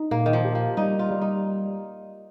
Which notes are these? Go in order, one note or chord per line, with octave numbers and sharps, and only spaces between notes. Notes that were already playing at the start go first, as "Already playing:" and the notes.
Already playing: D#4
A#2 A#3
D#3
F3
G4
F3
G3 D#4
F4
G3
D#4